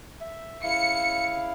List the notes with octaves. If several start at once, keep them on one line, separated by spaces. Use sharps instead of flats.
E5
C#3 E4 F5 C#7